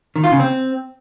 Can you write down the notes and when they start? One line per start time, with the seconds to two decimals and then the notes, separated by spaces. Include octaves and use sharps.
0.16 D#3
0.24 F4
0.32 C#3
0.40 C4